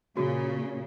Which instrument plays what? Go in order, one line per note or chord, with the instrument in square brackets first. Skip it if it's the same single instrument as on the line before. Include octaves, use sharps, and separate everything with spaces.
[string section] A#2 C#3 [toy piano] F#4